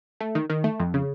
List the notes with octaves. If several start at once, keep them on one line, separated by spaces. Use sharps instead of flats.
A3
D#3
D#3
A3
F2
C#3